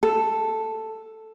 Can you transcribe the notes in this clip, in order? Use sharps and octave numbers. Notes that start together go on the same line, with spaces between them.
A4